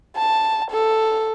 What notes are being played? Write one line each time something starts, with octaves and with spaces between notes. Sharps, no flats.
A5
A4